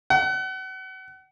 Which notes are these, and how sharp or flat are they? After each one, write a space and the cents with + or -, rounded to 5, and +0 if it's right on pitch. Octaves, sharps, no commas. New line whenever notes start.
F#5 +35